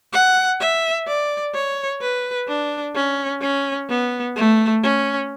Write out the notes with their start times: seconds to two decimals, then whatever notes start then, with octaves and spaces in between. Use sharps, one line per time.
0.13 F#5
0.60 E5
1.07 D5
1.54 C#5
2.01 B4
2.48 D4
2.96 C#4
3.41 C#4
3.89 B3
4.36 A3
4.83 C#4